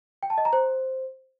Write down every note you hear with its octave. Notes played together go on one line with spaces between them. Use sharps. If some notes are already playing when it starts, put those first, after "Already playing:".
G5
A5
D#5
A#5
C5